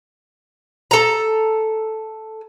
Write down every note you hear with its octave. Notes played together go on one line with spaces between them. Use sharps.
A4 A#5